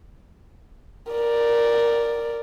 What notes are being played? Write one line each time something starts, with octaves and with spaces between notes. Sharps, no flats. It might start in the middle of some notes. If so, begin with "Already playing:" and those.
A#4 D5